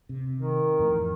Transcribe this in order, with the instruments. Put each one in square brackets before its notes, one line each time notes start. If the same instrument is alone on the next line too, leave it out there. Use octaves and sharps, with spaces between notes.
[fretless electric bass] C3
[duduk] D#3
[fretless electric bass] F2 A2 E3